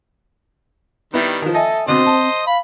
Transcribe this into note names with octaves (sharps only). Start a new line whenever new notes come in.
D#3 G3 B3 E4
D#3 F3
A4 D#5 E5 G#5
B2 D3 C4 C5 D#5
A5
F5 B5